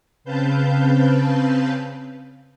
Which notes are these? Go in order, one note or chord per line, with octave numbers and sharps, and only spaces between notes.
C#3 C4 B4 F5 A5 G6